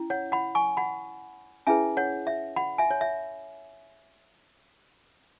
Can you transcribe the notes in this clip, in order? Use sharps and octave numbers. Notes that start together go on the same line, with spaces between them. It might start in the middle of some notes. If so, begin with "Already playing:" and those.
Already playing: C#4 E4
C#5 F#5
F#5 B5
G#5 C#6
F#5 B5
C#4 E4 G#4 B4 E5 G#5
C#5 F#5
E5
F#5 B5
E5 G#5
C#5
E5